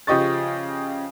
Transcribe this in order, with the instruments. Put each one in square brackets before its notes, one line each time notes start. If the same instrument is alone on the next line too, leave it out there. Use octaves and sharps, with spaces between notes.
[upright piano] C#3 F3 G4 D#5 C#6 A6